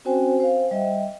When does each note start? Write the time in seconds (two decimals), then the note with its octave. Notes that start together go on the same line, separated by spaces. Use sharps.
0.05 C4 C#4 F#4 C5 G5 G#5
0.40 C5 F5
0.71 G3 D#5 E5 G5